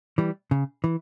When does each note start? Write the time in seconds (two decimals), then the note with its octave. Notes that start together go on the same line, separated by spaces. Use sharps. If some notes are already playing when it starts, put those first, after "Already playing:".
0.18 E3 G3
0.51 C#3
0.84 E3